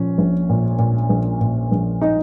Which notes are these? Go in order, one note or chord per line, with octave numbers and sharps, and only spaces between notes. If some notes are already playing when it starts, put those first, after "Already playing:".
Already playing: A#2 F3 C#4
A#1
A#2
A#2
A#1
A#2
A#1
D#4